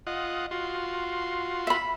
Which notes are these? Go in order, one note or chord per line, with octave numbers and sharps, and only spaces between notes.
F4 D#5 F#5
F4 F#4 C6
E5 B5